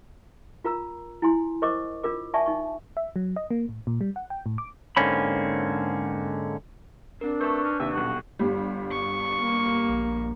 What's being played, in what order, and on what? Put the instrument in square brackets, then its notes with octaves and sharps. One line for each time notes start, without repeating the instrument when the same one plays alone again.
[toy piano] F4 A#4 A#5 E6
E4 G#5 C6
A#4 C5 D#5 C#6 D6
D4 F4 A#4 D6
D5 E5 G#5 A5 C#6
D#4 C#6
[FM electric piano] E5
F#3
D#5
A#3
A2
A#2
G3
F#5
G5
A2
D6
[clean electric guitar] G#2 D3 A#3 C4 C#4 B5
[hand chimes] C4 A#4 [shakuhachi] D4
[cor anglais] A3 [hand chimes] B4 C#6 [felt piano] A5 G6
[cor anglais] C#4
[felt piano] D#2 C3 [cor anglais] E5
[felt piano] D#1 B1 [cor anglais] F#4
[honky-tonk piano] G1 G3
[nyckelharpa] C#6
[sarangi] A#3
[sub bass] A#1